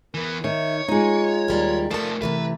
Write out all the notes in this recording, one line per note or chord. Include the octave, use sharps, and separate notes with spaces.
E3 B3 A#4
D#3 C#5 E5
G#3 D#4 F4
D#2 G3 A#4
F3 A3 A4 A#4 A5
C3 E3 A3 B4